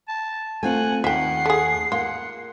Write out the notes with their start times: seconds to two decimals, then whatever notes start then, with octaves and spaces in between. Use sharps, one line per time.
0.08 A5
0.63 A3 C4 F4 F#5 G#5
1.04 D#2 E5 F#5 G5 C7
1.46 A3 G#4
1.92 A#3 F4 F#5